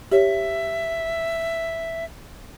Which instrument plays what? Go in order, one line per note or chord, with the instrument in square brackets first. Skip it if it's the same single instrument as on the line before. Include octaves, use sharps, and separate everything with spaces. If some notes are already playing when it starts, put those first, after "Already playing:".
[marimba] G4 C#5 [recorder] E5